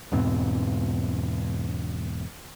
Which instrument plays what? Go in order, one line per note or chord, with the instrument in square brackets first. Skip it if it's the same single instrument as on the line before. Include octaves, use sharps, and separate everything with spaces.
[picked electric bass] E2 G#2 B2 C4